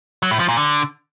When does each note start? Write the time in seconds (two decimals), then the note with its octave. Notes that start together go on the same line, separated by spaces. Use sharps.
0.22 F#3
0.31 A2
0.40 F3
0.48 A#2
0.57 D3